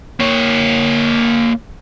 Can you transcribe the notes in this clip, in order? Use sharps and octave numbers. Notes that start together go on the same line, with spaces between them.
A#3 C#5